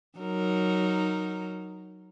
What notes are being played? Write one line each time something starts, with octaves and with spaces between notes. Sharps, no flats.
F#3 D#4 A#4